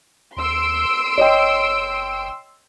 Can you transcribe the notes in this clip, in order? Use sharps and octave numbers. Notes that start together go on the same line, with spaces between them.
D#2 C6 E6 D7
F#1 C#5 D#5 G5